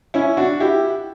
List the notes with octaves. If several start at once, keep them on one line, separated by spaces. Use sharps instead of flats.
C#4 E4
D4 F#4
E4 G4